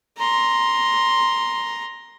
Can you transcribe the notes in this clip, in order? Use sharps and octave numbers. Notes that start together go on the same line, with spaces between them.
A#5 C6